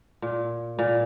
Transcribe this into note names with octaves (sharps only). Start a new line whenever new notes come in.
A#2
A#2